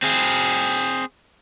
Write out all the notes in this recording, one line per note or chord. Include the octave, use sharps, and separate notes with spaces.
C4 G#4